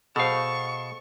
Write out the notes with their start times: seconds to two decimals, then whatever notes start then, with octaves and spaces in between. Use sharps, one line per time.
0.16 B2 G#4 A4 C5 F5 C#6